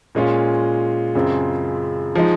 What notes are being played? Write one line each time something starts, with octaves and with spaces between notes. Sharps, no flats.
A#2 G#3 C#4 F4
F#2 C#3 G#3 C4 F4
F3 G#3 D#4